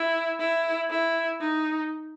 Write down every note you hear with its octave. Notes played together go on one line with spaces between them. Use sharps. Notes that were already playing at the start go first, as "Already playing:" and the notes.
Already playing: E4
E4
E4
D#4